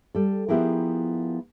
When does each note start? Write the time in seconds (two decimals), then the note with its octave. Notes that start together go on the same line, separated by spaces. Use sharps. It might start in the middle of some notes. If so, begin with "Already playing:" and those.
0.15 G3 A4
0.48 F3 B3 E4 G4 G#4 A#4